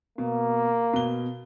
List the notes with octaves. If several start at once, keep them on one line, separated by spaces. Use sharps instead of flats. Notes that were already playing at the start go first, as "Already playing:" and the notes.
B2 A#3
B2 G7